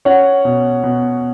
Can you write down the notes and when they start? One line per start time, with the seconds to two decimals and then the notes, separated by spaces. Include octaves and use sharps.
0.05 C#4 C#5 F#5
0.45 B2
0.83 B2